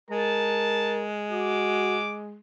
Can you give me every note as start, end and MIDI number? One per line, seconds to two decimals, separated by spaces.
0.10 2.37 56
0.10 1.07 70
0.10 0.94 81
1.31 2.00 66
1.31 2.16 86